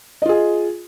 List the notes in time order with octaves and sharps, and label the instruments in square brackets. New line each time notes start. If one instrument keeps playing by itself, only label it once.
[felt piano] D#5
F4
G#4